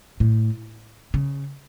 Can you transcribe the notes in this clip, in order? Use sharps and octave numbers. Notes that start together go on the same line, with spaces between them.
A2
C#3